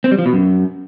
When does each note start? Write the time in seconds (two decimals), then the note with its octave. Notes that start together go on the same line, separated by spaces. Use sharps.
0.04 C4
0.11 G3
0.19 F3
0.26 B2
0.33 F#2